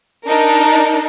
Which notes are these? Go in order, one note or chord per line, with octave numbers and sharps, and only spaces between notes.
D4 D#4 A#4